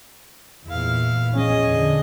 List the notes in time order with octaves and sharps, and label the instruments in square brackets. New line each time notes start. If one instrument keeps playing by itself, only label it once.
[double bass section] E2 A#2 [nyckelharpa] E4 F5
[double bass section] E2 F3 C#4 [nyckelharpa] G#4 D#5
[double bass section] E2 D3